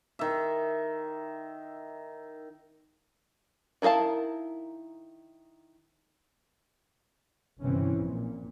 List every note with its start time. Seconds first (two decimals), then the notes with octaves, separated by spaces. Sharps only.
0.19 D#3 E5
3.82 D#3 E4 A#4 F5 A5
7.60 G1 C3 E3 C4 C#4
7.95 A#1 A#2